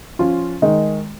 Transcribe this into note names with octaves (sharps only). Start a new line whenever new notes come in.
F3 C#4 F4
D#3 G#3 D#4